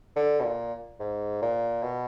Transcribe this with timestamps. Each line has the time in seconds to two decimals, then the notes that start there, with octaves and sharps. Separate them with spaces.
0.16 D3
0.40 B2
0.44 A#2
1.00 G#2
1.42 A#2
1.83 B2